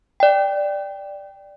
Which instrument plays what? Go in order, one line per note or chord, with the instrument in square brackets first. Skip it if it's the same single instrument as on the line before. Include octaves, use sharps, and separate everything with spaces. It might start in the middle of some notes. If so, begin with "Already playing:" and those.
[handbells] D5 G5